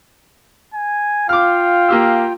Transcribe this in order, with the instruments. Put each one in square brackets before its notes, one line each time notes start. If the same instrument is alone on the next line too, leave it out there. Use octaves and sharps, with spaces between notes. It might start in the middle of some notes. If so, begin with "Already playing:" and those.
[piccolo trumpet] G#5
[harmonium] F4 G5 [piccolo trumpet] F5 [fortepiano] D6 F6
[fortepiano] A#3 G4 E6